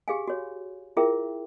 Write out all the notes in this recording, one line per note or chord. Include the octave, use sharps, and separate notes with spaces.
G4 G#4 F5 G#5
F#4 C#5
E4 F4 G#4 A#4 E5 G5